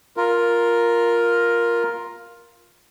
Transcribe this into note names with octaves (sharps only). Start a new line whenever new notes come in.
F4 A#4